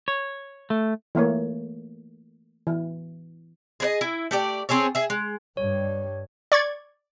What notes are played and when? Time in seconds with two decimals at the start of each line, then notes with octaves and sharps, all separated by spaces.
0.08 C#5
0.70 A3
1.15 E3 A3 A#3 C#5
2.67 E3
3.80 G#4 B4 D#5
4.01 E4
4.31 A3 G4 D5
4.69 C4 G#4 A4 C#5
4.95 G#4 E5
5.10 G#3
5.57 G2 G3 C#5
6.52 D5 C#6 G#6 A6